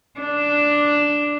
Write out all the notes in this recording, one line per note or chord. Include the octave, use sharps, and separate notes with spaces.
D4